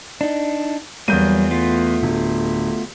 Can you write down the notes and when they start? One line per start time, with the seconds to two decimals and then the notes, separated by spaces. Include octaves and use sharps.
0.21 D4 D#4
1.08 E2 F#3 G3 A#3 G6 D#7
1.51 A3 B3 F4
2.03 D1